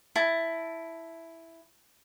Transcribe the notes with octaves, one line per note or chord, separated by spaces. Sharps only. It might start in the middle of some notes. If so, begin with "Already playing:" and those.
E4 A5